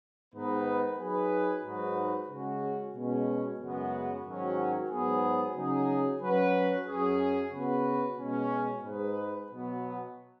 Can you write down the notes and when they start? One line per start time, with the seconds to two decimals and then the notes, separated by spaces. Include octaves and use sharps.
0.33 G#2 D#3 B3 D#4 B4
0.98 F#3 D#4 G#4 B4
1.63 G#2 F#3 D#4 F#4 B4
2.29 C#3 G#3 C#4 F#4
2.94 B2 G#3 C#4 F#4
3.60 F#2 C#3 G#3 B3 F#4
4.24 G#2 D#3 F#3 C#4 F#4
4.90 G#2 F#3 B3 G#4
5.56 C#3 F#3 D#4 G#4
6.22 F#3 C#4 F#4 B4
6.87 F#2 F#3 C#4 G#4
7.52 C#3 B3 F#4 B4
8.17 B2 G#3 C#4
8.82 G#2 G#3 D#4 B4
9.48 B2 F#3 B3